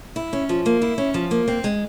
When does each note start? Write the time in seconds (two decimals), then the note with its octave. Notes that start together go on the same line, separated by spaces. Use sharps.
0.16 E4
0.33 C#4
0.49 F3
0.66 A#3
0.82 E4
0.98 C#4
1.14 F3
1.31 A#3
1.48 C4
1.64 G#3